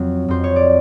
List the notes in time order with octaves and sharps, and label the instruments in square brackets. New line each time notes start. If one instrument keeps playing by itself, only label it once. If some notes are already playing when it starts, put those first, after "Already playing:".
Already playing: [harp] F2 F#3
F2 C5
C#5
D5